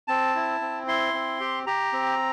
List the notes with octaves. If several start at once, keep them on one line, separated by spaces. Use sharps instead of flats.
C4 A5
E4
C4
E4 C6
C4
G4
G4 A#5
C4